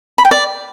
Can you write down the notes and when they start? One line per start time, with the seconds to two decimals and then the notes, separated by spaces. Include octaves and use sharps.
0.18 B5
0.25 G5
0.31 D5